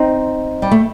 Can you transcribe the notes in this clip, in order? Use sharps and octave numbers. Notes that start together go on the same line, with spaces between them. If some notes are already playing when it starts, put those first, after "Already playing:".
Already playing: C4 D#4
G3
A3